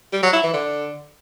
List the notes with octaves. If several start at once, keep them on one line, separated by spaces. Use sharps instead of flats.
G3
F#3
E4
E3
D3